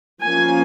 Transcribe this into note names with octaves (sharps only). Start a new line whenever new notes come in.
F3 A#3 C#4 G#5